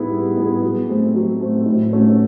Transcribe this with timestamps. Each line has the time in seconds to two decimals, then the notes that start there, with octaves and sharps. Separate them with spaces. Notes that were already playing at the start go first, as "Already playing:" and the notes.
Already playing: G3 B3 E4 G#4
0.11 G3
0.37 B3 E4 G#4
0.63 F#3
0.89 A3 C4
1.15 F#3
1.41 A3 C4
1.66 A2
1.92 F#3 A3 C#4 F#4